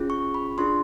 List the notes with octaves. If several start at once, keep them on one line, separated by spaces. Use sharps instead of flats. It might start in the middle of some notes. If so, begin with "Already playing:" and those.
Already playing: C#4 F4 G#4
C#6
B5
D4 F4 G#4 C6